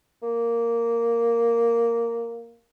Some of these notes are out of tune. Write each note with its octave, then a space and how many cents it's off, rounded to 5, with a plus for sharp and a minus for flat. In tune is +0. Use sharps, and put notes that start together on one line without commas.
A#3 -5